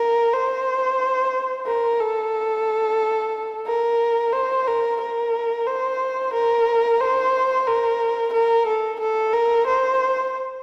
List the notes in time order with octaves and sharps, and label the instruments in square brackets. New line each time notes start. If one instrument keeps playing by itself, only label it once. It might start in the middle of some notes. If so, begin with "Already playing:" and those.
Already playing: [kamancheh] A#4
C5
A#4
A4
A#4
C5
A#4
A#4
C5
A#4
C5
A#4
A#4
A4
A4
A#4
C5